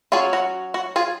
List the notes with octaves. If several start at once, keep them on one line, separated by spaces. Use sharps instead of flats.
F#3 C#4 F4 G#4
F#4
F#4
F4 G#4